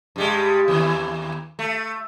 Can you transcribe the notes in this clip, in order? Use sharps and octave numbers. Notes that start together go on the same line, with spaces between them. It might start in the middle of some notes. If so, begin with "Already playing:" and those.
G2 G3 G#3
D#2 E3
A3